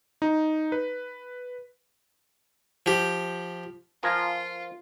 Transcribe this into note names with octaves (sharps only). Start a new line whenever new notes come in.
D#4
B4
F3 G4
F3 F4 A#4 G#5